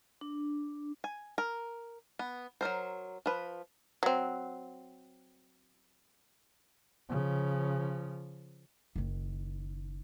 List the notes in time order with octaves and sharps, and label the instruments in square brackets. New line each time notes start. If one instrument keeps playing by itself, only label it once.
[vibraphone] D4
[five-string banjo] G#5
A#4
B3
F#3 A#3 A#4 C5
F3 B4
[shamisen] F#3 C4
[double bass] C#3 F3
[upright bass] F#1 D#3